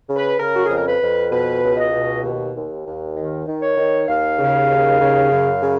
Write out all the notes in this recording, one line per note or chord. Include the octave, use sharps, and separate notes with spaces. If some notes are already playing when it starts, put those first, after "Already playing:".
C#3
B4
C#3 A#4
F#4
F2 G#4
A#4
B4
F2
B2 B4
C#2
D#5
B2
D#2
D#2
D#2
D#3
D#3
C#5
D#3
D#2 F5
C#3
D#2
C#3
F#2
C#3